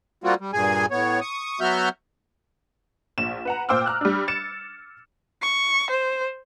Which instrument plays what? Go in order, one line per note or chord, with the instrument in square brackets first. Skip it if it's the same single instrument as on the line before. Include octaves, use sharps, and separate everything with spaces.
[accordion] G3 A#3 C4 F4 F#4
G3
G2 A#2 G#4 G#5
A2 B3 C#5
C#6 D#6
F#3 B3 F#4 E5 F6 G6
[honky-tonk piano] A#1 E7
B4 F#5 A#5
A#2 C5 G5 D6 E6 F6
A#5 F6 F#6
G3 D4
A6 C#7 E7
[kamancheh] C#6
C5